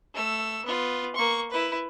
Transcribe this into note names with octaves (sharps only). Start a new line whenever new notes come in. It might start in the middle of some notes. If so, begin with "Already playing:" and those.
A3 E6
B3 F4
A#3 C#6
E4 B4